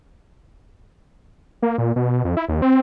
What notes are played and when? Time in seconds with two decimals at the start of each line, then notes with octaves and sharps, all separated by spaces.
1.62 A#3
1.78 A#2
1.96 B2
2.24 F2
2.37 E4
2.48 D#2
2.62 C4